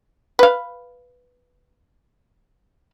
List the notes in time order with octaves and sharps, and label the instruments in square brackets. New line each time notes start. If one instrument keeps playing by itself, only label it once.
[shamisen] B4 F5